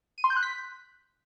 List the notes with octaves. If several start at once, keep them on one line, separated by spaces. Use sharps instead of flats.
D#7
C6
G6
F#6
B6